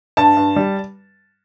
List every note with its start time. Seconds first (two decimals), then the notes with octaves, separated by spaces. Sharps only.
0.17 G2 A5
0.37 G2
0.56 G3